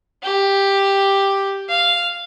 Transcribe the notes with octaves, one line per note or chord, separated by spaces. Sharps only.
G4
F5